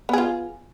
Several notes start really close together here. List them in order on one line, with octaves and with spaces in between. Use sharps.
B3 G#4 F4